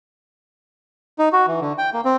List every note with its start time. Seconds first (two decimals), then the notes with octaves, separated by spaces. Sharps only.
1.19 D#4
1.33 F#4
1.47 E3
1.61 D3
1.78 G5
1.93 A#3
2.05 C4